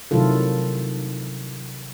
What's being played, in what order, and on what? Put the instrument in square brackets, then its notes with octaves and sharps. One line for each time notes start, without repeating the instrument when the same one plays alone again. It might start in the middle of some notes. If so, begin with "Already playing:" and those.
[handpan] C3 D#3 F#3 E4 F4 A4